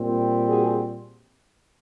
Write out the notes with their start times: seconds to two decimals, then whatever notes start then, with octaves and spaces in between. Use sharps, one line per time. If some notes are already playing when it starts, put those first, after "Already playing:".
Already playing: A#2 G3 C4
0.48 F#4 G#4